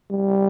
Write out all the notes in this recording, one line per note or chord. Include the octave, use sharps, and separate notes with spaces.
G3